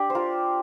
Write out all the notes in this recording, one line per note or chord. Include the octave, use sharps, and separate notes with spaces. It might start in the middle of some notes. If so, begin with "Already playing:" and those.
Already playing: D4 G4
C5
F4 A#4